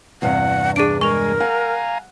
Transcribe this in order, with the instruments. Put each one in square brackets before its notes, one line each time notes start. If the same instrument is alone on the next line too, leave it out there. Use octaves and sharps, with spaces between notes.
[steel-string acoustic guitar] E2 G2 C3 [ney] F#5
[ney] D4 [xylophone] G#4 D7
[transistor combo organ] G#3 G#5 [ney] A#4 [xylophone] C#6 F7
[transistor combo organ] F5 G#5 A#5 [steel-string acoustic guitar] F#5